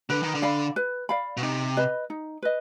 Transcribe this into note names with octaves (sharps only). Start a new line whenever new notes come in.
D3 B4
D#3
D3
D5 F5 B5
B4
D5 F5 B5
B2
C3 D#4
B4 D#5 B5
D#4
B4 D#5